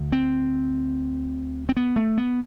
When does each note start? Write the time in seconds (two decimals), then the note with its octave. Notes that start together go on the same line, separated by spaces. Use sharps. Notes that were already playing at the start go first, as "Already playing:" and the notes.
Already playing: D2 D3
0.12 C4
1.69 C4
1.77 B3
1.96 A3
2.18 B3